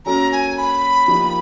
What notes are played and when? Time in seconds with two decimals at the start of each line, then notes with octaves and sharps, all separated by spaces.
0.06 F#3 A#3 C#4 F#4 A4 A#5
0.32 G#5
0.57 B5
1.08 F3 A#3 D#4 G4